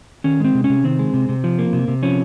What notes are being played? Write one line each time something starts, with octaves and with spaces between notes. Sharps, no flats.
D#3 C#4
G#3 C4
C3
C#4
C3
D#3 C4
G#3
C3
C3
F3
A#3
C3
C3
F3 C#4